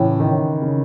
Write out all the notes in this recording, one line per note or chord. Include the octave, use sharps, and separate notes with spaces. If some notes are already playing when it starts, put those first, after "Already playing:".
Already playing: A2 C#3 E3
D#3
C#3